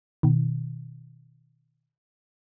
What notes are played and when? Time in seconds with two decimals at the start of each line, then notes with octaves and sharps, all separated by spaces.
0.23 B2 D#3